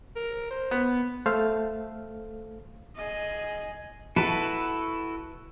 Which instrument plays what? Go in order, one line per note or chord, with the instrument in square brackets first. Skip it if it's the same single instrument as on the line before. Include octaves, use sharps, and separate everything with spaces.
[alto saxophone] A#4
C5
[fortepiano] B3
[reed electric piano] A3 A4 C5 F5
[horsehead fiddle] G#4 D#5
[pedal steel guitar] E4 F#4 A4 [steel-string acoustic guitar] B4 A5